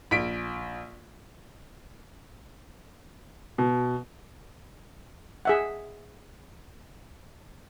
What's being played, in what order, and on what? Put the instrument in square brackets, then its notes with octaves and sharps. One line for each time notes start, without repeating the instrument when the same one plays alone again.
[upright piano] A#1 B6 D7
B2
[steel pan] G#4 E5 F#5